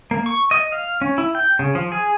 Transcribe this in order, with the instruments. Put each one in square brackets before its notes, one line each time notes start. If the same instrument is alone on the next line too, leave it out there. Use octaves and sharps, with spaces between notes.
[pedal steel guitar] A#3
C#6
D#5
F5
C#4
E4
G5
C#3
F3
G#4